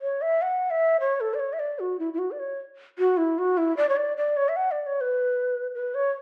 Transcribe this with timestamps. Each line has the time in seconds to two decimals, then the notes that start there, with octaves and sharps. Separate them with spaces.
0.01 C#5
0.22 E5
0.42 F#5
0.70 E5
1.00 C#5
1.21 A4
1.34 D5
1.39 C#5
1.53 E5
1.60 D5
1.79 F#4
1.99 E4
2.13 E4
2.19 F#4
2.31 D5
2.39 C#5
2.99 F#4
3.17 E4
3.38 F#4
3.58 E4
3.77 D5
3.89 C#5
3.97 D5
4.17 D5
4.37 C#5
4.49 E5
4.56 F#5
4.71 D5
4.86 C#5
5.01 B4
5.75 B4
5.95 C#5